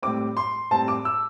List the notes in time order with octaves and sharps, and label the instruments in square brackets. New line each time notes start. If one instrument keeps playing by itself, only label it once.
[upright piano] A2 G3 C4 D6
C6
A2 G3 C4 A5
D6
E6